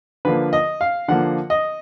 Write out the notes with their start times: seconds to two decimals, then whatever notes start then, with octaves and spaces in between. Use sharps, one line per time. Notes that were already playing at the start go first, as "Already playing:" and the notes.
0.25 D3 F3 A#3 B4
0.53 D#5
0.81 F5
1.08 D3 F3 A#3 F#5
1.50 D#5